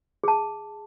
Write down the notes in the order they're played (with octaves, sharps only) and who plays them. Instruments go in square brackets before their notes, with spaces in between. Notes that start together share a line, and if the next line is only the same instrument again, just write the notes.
[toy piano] G#4 A5